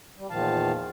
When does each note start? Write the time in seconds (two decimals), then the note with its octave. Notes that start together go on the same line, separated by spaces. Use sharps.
0.18 G3
0.30 E2 A#2 D#3 F3 F5 A5